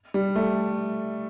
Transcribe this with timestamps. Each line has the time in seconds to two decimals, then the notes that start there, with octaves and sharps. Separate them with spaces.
0.14 G3
0.35 A3